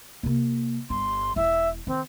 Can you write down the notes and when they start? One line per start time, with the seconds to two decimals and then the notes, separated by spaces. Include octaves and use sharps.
0.23 C3 A#3
0.90 G1 G3 C6
1.36 E1 E4 E5
1.87 D#3 C4